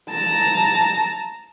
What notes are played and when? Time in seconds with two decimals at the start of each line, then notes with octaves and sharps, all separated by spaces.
0.10 A5 A#5